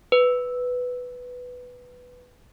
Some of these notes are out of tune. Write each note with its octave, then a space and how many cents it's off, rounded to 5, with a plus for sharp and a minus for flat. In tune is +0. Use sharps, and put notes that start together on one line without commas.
B4 +5